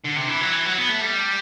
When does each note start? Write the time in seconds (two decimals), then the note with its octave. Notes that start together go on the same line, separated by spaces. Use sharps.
0.04 D3
0.16 C3
0.28 E3
0.41 F#3
0.53 E3
0.66 F#3
0.78 B3
0.89 A3
1.02 G3